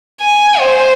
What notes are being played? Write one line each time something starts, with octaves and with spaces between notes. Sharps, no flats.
G#5
C5